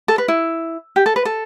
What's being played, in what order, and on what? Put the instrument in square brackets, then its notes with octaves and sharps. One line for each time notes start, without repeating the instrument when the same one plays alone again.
[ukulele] A4
B4
E4
G4
A4
B4
A4